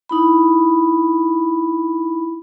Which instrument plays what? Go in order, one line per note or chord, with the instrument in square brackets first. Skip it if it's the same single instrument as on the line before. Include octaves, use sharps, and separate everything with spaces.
[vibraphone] D#4 E4 B5